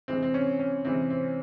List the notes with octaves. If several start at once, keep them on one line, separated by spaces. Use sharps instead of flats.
C3 E3 G#3 C4
C4
C#4
C#4
C3 E3 G#3 C4
C4